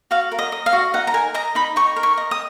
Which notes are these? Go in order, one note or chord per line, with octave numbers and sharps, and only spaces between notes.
F#4 F5
A#4
D#5
D#5
F5
F#4
D#4 F#5
A#5
A#4 G#5
D#5 A#5
D#4 B5
D#4 C#6
A#4
C#6
D#5
D#6